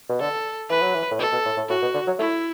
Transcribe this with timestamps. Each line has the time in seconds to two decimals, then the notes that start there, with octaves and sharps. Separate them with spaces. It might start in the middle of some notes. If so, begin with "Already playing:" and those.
0.09 B2
0.20 D3 A4
0.70 E3 B4
0.82 F#3
0.95 E3
1.11 A2
1.19 B2 A4
1.32 B2
1.45 A2
1.57 A2
1.69 A2 F#4
1.82 B2
1.94 D3
2.07 F#3
2.19 A3 E4